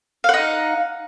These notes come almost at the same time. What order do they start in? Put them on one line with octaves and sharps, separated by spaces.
F5 F#5 D#4